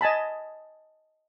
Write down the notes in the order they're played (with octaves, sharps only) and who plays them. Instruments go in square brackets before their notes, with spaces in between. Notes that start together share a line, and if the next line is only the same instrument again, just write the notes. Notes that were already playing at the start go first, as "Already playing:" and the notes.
[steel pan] D#5 G#5 A5 B5